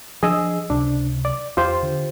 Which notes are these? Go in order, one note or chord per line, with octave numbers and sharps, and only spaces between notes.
F3 D4 G#4 D#5 E6
C#2 C3 D4
D5
E2 F4 G4 C5
D3